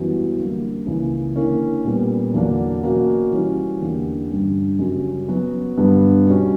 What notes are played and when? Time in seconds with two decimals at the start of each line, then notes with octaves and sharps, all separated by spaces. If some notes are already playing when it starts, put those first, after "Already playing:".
Already playing: F#2 E3 G3 B3 F#4
0.37 D3 G3 A#3
0.86 C#2 C#3 E3 A#3
1.35 D3 A#3 C#4 E4 A#4
1.85 A#2 G3 B3
2.34 E2 D3 F#3 A#3 D4
2.83 B2 A#3 C#4 F#4
3.32 E3 G3 C#4 F#4
3.81 E2 D3 A#3 D4 G4
4.30 G2 D3 G3 C#4
4.79 F#2 C#3 G3 C#4
5.28 F#3 B3 F#4
5.77 G2 D3 G3 B3
6.26 B2 G3 C#4